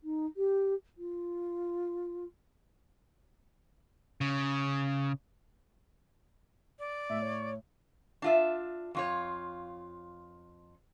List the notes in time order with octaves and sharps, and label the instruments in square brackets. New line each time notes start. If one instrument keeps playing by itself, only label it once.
[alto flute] D#4
G4
F4
[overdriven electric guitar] C#3
[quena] D5
[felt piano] A2 [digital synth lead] E5
[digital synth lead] C#5
[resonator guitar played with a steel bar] D4 F4 E5
F2 F4 C#5